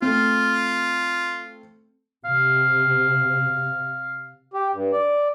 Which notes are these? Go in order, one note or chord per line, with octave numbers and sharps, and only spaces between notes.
A3 C4 F4
C3 F5
G4
G2
D5